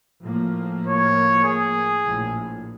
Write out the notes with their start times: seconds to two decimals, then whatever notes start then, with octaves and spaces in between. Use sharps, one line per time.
0.23 A2 F3 A#3
0.87 C#5
1.44 G#4
2.04 A#1 A2